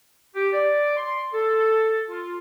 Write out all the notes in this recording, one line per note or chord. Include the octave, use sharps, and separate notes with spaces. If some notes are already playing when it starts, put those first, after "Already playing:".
G4
D5
C6
A4
F4